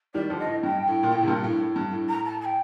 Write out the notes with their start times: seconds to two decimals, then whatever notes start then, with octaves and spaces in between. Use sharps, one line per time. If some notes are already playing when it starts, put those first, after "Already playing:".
0.14 D#3 G3 D5
0.30 D3 F3
0.39 D#5
0.47 A2
0.63 G2 G5
0.87 A2
1.03 A#2
1.12 A2
1.22 C3
1.28 G2 A#2
1.44 A2
1.60 A2
1.76 G2
1.92 A2
2.08 A#5
2.25 A5
2.40 A5
2.45 G5